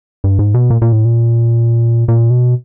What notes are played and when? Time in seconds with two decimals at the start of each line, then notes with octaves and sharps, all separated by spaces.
0.24 G2
0.39 G#2
0.54 B2
0.70 A#2
0.82 A#2
0.92 A2
1.05 A#2
2.08 A#2
2.30 B2